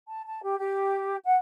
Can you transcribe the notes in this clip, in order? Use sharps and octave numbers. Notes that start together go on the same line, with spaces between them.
A5
A5
G4
G4
F#5